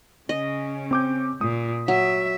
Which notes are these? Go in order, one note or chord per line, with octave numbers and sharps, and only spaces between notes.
C#3 C#4 D#5
C4 D6 G6
A#2 D#6
F#3 E5